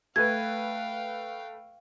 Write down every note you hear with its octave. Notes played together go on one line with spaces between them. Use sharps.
A3 B4 F5 G5 G#6